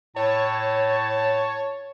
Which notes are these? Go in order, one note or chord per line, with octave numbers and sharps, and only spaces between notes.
A2 C#5 A5